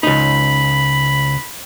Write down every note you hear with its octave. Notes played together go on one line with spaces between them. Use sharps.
C#2 D#4 B5